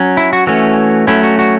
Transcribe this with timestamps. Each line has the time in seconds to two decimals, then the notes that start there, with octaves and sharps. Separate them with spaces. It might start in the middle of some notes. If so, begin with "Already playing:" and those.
Already playing: F#3 C#4
0.17 E4
0.33 F#4
0.47 E3 A3 C#4 F#4
1.07 F#3 A3 C#4 E4
1.24 F#4
1.39 F#4